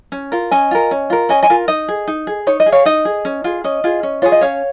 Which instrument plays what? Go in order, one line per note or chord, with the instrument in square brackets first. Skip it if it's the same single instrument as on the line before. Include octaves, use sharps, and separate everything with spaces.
[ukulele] C#4
F4 A#4
C#4 D#5 G#5
F4 A#4
C#4
F4 A#4
C#4 D#5 G#5
D#5 G#5
F4 A#4
D#4 D#5
G#4
D#4
G#4
D#4 C#5
D#5
G#4
C#5 F5
D#4 D#5
G#4
C#4
F4 G#4
C#4 D#5
F4 G#4
C#4
F4 G#4 C#5
D#5
C#4 C#5 F5